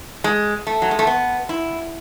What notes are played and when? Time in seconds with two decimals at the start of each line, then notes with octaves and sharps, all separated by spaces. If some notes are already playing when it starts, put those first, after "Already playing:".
0.24 G#3
0.67 A3
0.82 F#3
0.91 G#3
0.99 A3
1.07 B3
1.49 E4